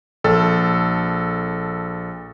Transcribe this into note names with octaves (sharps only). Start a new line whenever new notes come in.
A#1 A4